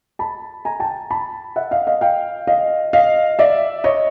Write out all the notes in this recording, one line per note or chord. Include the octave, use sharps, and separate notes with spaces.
A5 B5
G#5 A#5
G5 A5
A5 B5
E5 F#5
D#5 F5
D#5 F5
F5 G5
D#5 F5
D#5 F5
D5 E5
C#5 D#5